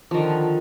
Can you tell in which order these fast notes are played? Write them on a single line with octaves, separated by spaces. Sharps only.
F3 D#3 D3